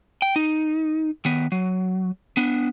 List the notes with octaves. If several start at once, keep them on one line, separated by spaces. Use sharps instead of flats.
G5
D#4
D#3 B3
F#3
B3 D4